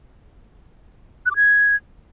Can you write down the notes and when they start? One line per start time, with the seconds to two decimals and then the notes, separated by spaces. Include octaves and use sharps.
1.26 F#6
1.31 D6
1.36 G#6